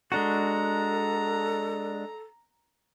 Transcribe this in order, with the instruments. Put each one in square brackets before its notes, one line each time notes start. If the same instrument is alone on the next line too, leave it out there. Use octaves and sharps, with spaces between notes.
[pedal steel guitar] G#3 D4 F#4 [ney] A4 [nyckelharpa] A#5